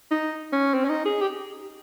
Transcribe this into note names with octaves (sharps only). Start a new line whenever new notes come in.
D#4
C#4
C4
C#4
D#4
G#4
G4